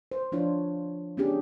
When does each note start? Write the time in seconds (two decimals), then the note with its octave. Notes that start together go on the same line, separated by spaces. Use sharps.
0.12 C5
0.32 F3 D4 F4 C#5
1.17 B3 C#4 D4 G4 G#4